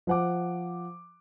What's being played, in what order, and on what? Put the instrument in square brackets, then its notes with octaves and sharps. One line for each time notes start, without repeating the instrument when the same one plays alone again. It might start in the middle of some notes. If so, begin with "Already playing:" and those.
[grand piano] F3 F#5 D6